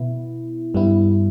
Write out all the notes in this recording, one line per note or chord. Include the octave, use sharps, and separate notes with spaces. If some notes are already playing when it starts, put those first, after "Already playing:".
Already playing: B2 B3 E4
G2 G3 B3 E4